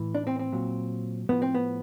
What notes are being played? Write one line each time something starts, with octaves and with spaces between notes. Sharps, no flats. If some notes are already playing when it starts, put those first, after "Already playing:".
Already playing: A2 E3
D4
C4
C4
A#2 F#3
A2 F3 B3
C4
B3